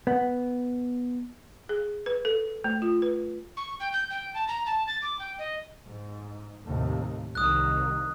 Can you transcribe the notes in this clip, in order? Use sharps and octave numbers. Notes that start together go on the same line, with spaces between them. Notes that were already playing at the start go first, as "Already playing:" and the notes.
B3
G#4
B4
A4
A3
F4
B4
C#6
G5
G6
G5
A5
A#5
A5
A6
D6
G5
D#5
G#2
D#2 A2 C3
C2 D#3 D#6 F#6